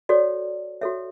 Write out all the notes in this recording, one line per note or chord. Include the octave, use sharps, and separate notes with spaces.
F#4 A4 C#5 D5
F#4 A4 C#5 E5